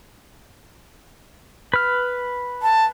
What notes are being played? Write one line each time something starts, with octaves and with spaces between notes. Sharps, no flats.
B4 F6
A5